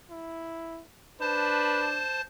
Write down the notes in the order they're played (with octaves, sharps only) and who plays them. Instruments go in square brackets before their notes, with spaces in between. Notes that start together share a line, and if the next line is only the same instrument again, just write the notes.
[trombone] E4
[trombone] D4 [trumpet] B4 [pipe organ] C5 A5